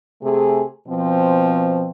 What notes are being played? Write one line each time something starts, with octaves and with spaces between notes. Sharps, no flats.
C3 A3 G#4
B2 F3 C4